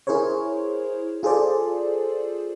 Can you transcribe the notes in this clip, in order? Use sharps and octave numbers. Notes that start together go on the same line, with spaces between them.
E4 G#4 A#4 C5 C#5
F4 G#4 A4 C5 D5